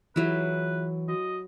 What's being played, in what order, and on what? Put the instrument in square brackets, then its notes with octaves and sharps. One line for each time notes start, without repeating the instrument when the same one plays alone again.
[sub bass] E3 [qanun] F#3 E4 [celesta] F4 G#4 E5 [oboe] B4
[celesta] F#4 [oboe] D#5